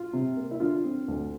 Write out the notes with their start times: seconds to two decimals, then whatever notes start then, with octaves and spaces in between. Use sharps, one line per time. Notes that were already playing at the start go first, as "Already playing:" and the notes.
Already playing: F4
0.13 C3
0.37 A#3
0.51 E4
0.60 D3 F4
0.84 C4
1.08 D2